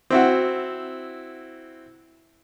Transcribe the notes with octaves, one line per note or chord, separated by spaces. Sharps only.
C4 E4 F#4